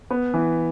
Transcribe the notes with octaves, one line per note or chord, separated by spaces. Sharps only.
B3
E3